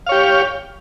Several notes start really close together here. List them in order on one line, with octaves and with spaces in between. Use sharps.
F5 C#5 G4